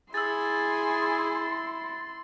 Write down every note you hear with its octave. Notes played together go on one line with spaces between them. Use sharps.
E4 G#4 C6 E6 A6